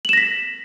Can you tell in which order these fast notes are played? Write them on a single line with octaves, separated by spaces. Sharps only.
F#7 E7 A#6 B6